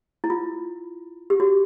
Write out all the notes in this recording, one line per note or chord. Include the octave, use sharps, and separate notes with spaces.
E4
F4
G4
F#4